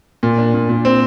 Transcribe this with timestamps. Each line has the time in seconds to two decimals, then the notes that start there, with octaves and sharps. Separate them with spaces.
0.23 A#2
0.38 D4
0.54 A#2
0.69 A#2
0.85 C4